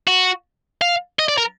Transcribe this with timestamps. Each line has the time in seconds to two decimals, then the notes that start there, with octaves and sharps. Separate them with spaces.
0.07 F#4
0.81 F5
1.19 D#5
1.29 D5
1.38 A#4